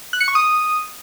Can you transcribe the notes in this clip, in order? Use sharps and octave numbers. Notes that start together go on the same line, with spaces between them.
F#6
C#7
C#6
D#6